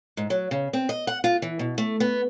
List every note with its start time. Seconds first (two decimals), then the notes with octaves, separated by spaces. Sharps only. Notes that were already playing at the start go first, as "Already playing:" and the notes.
0.17 G#2
0.30 F#3
0.51 C#3
0.73 C4
0.89 D#5
1.07 F#5
1.24 F4
1.42 E3
1.59 B2
1.78 A3
2.00 B3